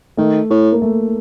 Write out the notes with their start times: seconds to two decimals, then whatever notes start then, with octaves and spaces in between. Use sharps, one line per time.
0.17 D#3 A3
0.50 A2
0.72 A#3
0.82 A3